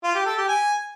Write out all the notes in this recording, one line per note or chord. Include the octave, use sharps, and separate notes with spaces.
F4
G4
A4
G4
G#5